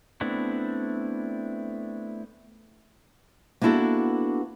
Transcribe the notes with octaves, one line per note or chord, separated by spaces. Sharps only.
A3 B3 C4 D4 E4
A#3 B3 D4 E4 F#4 A4